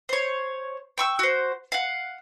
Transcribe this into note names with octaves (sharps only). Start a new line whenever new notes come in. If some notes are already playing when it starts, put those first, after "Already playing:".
C5 C#5
G5 C#6 E6
F#4 C5
F5 F#5